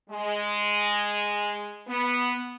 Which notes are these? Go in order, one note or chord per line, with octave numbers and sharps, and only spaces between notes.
G#3
B3